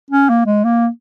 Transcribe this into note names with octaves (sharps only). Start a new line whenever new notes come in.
C#4
A#3
G#3
A#3